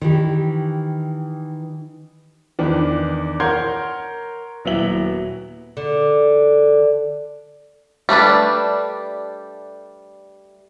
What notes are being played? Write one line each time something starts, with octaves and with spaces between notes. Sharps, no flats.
D#3 E3 G4
E2 D#3 D4 B4
A#4 C#5 F#5 C6 G6 G#6
D#1 F#3 B3 E4 E5 F#7
D3
G3 A3 D4 B4